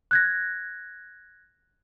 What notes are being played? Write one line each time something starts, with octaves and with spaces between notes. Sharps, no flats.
F#6 G#6 A#6